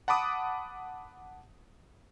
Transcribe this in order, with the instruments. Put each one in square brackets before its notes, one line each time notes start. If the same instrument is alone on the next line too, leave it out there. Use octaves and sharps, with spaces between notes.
[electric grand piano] F#5 A5 B5 D6 D#6